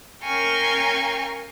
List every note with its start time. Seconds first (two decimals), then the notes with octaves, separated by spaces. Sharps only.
0.22 C#4 A#4 F5 G5 G#5 C#6